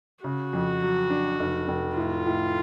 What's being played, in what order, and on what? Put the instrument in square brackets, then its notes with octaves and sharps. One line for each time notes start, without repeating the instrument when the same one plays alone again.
[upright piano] C#3 [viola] F#4
[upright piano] F2
F#3
D4
F1
F1
[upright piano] A2 [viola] F4
[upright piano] A2